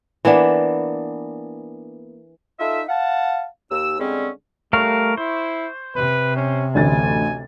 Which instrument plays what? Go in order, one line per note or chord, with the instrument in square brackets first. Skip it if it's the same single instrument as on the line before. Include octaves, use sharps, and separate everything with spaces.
[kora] E3 A#3 B3 D4
[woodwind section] D#4 F4 A4 D#5 E5
F5 F#5 A5
D#2 E6
D3 G3 G#3 C4 C#4
[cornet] G3 [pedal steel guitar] A3 A#4 F5 [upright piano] C#6
[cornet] E4 [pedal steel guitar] C5
[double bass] C3 [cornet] B4
[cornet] C#4
[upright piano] A1 D2 A6 [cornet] G#5